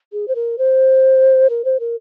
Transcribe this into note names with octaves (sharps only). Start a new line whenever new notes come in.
G#4
C5
A#4
C5
A#4
C5
A#4